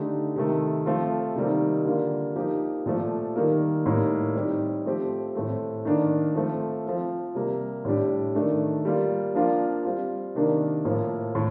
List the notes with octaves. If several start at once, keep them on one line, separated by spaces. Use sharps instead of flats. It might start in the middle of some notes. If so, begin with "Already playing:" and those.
Already playing: D3 A3 D#4 G4
C3 D#3 A3
F3 A3 C4 F4
C3 D#3 G3 A#3 D#4
D3 G3 A#3 F4
F3 A#3 D#4 G4
A#2 F3 A3
D#3 G3 A#3
A2 G3 A#3 D#4
G3 C4 D#4 G4
F3 A3 C4 G4
A2 A3 C4
D#3 A#3 D4
F3 A3 C4
F3 C4 F4
C3 G3 A#3
A2 G3 D4 G4
D#3 A3 D4
G3 A#3 F4
F3 A#3 D4 F4
G3 C4 F4
C3 D#3 A#3 D4
A2 F3 A#3
A2 A3